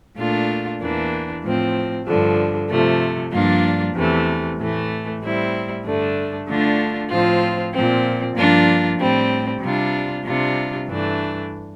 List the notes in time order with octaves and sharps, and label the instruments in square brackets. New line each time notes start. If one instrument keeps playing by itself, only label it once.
[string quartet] A#2 A3 D4 F4
E2 E3 A#3 D4
A2 F3 C4
G2 D3 F3
C3 F3 A3
G2 F3 A#3 D4 F4
E2 C3 E3 A3
A2 E3 A3
A2 G3 C4 E4
G2 D3 A3 D4
D3 A3 D4 F4
A2 F3 C4 F4
A#2 F3 C4
G2 F3 A#3 D4 F4
A2 G3 C4
C3 G3 D4 F4
C3 G3 D4 F4
G2 E3 A3 D4